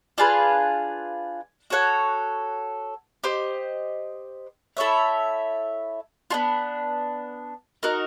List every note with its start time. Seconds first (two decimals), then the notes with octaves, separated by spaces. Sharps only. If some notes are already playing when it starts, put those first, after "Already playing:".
0.18 D4 F4 G#4 B4
1.70 F#4 A4 C#5 F#5
3.24 G4 C5 D#5
4.77 E4 A4 C#5 E5
6.30 B3 D4 F4
7.83 D#4 F#4 A#4